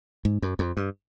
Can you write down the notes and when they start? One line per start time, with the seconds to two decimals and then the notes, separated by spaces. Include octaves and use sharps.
0.25 G#2
0.42 F#2
0.59 F2
0.77 G2